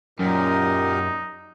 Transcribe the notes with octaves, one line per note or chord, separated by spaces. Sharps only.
F#2 A#2 D#4 G4 A#4